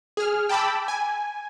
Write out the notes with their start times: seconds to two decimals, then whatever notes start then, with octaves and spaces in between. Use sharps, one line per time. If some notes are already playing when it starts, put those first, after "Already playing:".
0.17 G#4 F6
0.49 G5 A5 B5 D6 E6
0.88 G#5